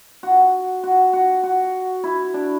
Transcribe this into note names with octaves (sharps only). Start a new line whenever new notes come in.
F#4
F#4
F#4
F#4
E4
D4